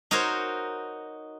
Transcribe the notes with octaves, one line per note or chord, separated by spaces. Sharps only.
D#4 F#4 A#4 C5 C#5